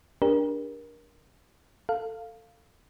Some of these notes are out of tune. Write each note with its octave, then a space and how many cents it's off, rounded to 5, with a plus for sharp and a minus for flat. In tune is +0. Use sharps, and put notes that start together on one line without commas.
D4 +0 G4 +30 A#4 +25
A4 +25 F5 +0